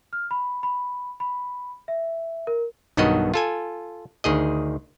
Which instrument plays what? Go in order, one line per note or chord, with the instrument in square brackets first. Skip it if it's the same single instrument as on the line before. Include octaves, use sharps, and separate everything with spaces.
[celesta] F6
B5
B5
B5
E5
A#4
[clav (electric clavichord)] B1 G2 D#3 B3 F#4 D#5
F4 A4 G#5
D2 D#3 G#4 D#5